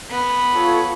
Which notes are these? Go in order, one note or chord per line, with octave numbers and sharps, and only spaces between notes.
B3
F4 A4 C#5